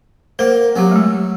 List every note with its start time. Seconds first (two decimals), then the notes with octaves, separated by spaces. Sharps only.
0.39 A#3 C5 F#5
0.76 F#3 C4 G4
0.91 G#3 A3